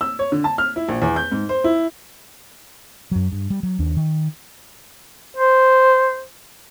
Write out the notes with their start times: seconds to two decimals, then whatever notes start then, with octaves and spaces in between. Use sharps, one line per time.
0.01 E6
0.19 C#5
0.32 D3
0.44 A5
0.58 F6
0.76 E4
0.89 A#1
1.02 E2
1.16 G6
1.31 G#2
1.49 C5
1.64 E4
3.11 F#2 F#3
3.32 G2
3.50 G3
3.63 F#3
3.79 D#2 D4
3.97 D#3
5.36 C5